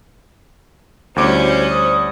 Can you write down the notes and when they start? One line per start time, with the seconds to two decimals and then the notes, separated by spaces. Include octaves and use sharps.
1.16 D2 G3 C#4 E4 F#4 C5 D5 D6
1.70 C5 D5 D#6